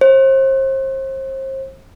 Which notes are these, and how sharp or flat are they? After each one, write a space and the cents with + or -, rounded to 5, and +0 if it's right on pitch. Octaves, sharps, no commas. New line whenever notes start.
C5 +35